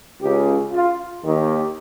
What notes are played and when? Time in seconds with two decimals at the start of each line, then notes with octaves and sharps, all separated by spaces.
0.21 C#2 C#3 G4
0.73 F4
1.23 D#2 D#3 G4